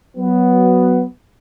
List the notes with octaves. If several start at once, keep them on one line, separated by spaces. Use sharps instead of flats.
F#3 B3